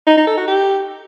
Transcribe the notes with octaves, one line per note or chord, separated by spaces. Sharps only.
D#4
D#4
A4
F#4
G4